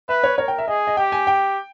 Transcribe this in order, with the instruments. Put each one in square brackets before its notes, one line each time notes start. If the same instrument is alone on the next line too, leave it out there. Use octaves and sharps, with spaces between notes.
[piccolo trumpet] B4 [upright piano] E5
[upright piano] C#5
[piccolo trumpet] A#4 [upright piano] C#5
[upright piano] G5
E5
[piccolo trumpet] G#4 [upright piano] D#5
[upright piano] D#5
[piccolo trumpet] G4 [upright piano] G5
[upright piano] G#5
G5